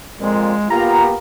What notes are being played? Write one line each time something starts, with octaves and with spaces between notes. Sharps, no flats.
F2 A#2 G#3
A#3 B3 F4 G4 A#5